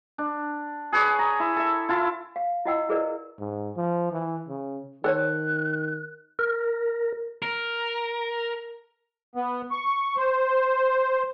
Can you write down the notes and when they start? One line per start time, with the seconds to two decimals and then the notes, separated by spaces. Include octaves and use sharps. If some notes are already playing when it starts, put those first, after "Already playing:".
0.18 D4
0.92 G#4 B4 C#5 D5
1.19 A#5
1.40 E4
1.56 A4 E5
1.89 E4 F4 A5
2.36 F5
2.66 E4 F4 D#5 F#5 G5 E6
2.89 E4 G#4 A#4 B4 D5 D#5
3.39 G#2
3.77 F3
4.12 E3
4.48 C#3
5.04 D#3 A4 C5 C#5 F#6
6.39 A#4
7.42 A#4
9.35 B3
9.71 C#6
10.17 C5